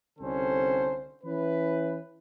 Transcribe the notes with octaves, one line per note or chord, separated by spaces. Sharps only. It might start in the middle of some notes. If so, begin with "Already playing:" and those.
C2 D3 C4 C#4 A4 C5
E3 C#4 E4 B4